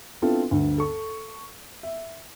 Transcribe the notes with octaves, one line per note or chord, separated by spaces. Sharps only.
B3 C4 D4 E4 F4 A4
D2 G2
A4 C#6
E5